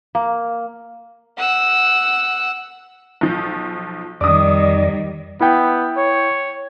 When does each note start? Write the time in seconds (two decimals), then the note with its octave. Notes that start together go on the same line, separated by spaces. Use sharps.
0.15 A#3
1.38 F#5 E6
3.21 B1 F3
4.21 F2 D#3 G3 D5 D6 D#6
5.41 B3 E4 G5
5.97 C#5